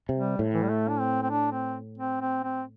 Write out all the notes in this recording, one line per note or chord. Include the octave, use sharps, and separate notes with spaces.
C3
G3
A2
E3
G3
A3
D4
C4
C4
D4
C4
C4
C4
C4